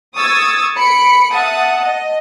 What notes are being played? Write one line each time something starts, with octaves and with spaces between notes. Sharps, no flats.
C#6 D#6 E6 G#6 A6
B5 C#7 D7
E5 F#5 A5 D#6
D#5